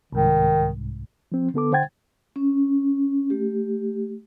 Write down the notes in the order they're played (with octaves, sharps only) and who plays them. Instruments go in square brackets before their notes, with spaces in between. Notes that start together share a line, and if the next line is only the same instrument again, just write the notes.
[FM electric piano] C2 G#2 [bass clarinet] D#3
[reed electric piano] F3 C4
D3 B3 A4 D6
D3 C5 F#5 G5 G#6 A6
[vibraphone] C#4
A3 G4